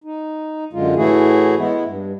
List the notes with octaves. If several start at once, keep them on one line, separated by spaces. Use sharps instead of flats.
D#4
F#2 D3 G#3 F4
A2 E3 A3 E4 F#4 G#4
G#3 B3 E4
G2